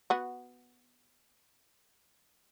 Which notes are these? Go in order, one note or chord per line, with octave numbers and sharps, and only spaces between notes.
B3 F#4